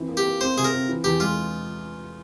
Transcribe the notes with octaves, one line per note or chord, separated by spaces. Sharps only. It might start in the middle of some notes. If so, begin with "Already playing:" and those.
Already playing: E3 C4
A#3
G4
A#3
C4 C5
C3 G#4
A#4
C4
E3
E2 G4
G#3 F4